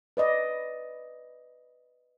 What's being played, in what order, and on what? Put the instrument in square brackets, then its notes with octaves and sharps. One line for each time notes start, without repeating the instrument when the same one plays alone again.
[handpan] B4 D5 D#5